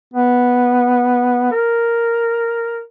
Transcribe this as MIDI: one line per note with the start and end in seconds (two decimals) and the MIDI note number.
0.13 1.49 59
1.51 2.81 70